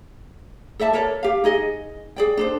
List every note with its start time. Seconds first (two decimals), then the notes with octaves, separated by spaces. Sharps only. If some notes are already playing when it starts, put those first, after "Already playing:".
0.79 A4 D5 E5 A5
0.93 A4 A#4 C#5 D5
1.23 G4 F5
1.44 D#4 G#4 D#5
2.16 G#4 D5 G5
2.37 D4 A4 C5